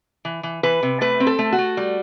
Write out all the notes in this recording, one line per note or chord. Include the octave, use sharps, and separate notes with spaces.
E3
E3
E3 B4
C3
A3 B4
C4
A4
A3
F#4
A3
G3